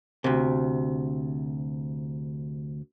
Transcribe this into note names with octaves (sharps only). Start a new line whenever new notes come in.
D2 C3